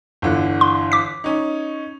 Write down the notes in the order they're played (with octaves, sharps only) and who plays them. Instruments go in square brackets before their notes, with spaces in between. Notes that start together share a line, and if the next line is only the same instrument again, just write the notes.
[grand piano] G1 D3 E3
[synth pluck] C6
D6 B6
[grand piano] C#4 D#4